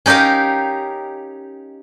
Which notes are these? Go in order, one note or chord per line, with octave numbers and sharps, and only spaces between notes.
C#4 D#4 G4 A#4 F5